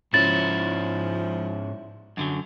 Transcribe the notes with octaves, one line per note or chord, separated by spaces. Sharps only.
G#2 F3 C#4 E4 A6
F#2 D3 F#3